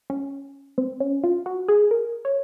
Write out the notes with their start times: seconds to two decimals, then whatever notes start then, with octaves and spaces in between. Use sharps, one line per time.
0.10 C#4
0.78 C4
1.00 C#4
1.24 F4
1.46 F#4
1.68 G#4
1.91 A#4
2.25 C#5